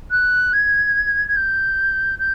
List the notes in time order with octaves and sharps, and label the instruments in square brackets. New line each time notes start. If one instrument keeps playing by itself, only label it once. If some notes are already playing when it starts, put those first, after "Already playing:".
[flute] F#6
G#6
G#6
G6
G6